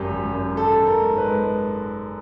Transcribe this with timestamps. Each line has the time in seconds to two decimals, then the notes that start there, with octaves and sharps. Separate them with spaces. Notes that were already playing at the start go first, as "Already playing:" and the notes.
Already playing: G#1 F#2 G4
0.12 G#1
0.35 F#2
0.57 D#3 A4
0.79 D#3
0.87 A#4
1.02 G#2
1.18 B4
1.24 G#3